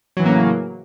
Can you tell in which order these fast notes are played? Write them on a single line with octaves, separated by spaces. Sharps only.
F#3 E3 A2 A#3 C#3